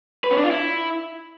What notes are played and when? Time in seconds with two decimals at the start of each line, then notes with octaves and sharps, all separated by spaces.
0.24 B4
0.31 C#4
0.37 D4
0.44 F4
0.50 E4